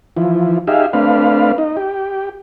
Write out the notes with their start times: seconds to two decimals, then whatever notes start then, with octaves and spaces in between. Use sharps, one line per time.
0.17 E3 F3
0.67 D#4 G4 G#4 E5 F5
0.93 A3 C4 D4 B4 F5
1.58 D#4
1.77 G4